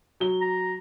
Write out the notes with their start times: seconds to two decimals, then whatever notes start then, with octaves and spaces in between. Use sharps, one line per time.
0.20 F#3 G7
0.41 A#5